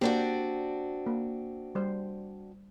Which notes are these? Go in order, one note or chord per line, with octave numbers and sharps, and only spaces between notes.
A#3 C4 D4 F#4 G4
A#3
G3 C5